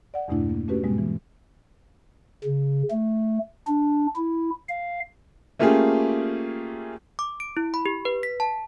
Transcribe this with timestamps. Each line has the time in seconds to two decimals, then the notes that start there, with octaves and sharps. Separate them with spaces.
0.14 D5 F#5
0.28 E2 G2 B2 A3 D4 E4
0.50 A#3
0.68 A3 C#4 F#4 G4 B4
0.84 G#2 B2 G3 G#3 B3
0.98 E3
2.45 C#3
2.91 A3
3.67 D4
4.16 E4
4.69 F5
5.59 A3 A#3 C#4 F4 G4 G#4
7.19 D6
7.40 D7
7.57 E4
7.74 B5
7.86 G4
8.05 B4
8.23 B6
8.40 A5